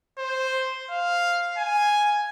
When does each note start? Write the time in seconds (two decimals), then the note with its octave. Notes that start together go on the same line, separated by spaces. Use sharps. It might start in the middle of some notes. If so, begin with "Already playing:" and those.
0.18 C5
0.91 F5
1.58 G#5